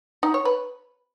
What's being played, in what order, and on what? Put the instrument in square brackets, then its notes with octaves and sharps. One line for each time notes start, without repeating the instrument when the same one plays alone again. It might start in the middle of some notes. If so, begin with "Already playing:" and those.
[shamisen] D#4
C#5
B4